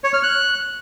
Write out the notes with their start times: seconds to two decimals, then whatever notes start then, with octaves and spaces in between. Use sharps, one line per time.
0.04 C#5
0.14 F6
0.23 F#6